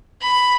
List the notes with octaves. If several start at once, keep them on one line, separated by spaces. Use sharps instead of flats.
B5